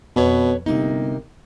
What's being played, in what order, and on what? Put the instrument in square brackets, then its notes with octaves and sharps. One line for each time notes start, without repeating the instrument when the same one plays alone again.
[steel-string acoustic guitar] F2 B4 C#5 [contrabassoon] B2
[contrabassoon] G1 [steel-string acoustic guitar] C3 A#3 D#4